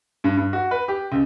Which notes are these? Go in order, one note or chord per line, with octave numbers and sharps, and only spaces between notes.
G2
G2
F#4
B4
G4
C#2